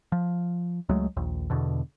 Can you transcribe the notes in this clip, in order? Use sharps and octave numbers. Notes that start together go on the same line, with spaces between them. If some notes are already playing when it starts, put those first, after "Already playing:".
F3
C#2 F#3 G#3 A3
A#1 D#2
E2 B2 D3